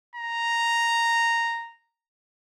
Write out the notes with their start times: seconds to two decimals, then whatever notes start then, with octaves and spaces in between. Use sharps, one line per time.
0.16 A#5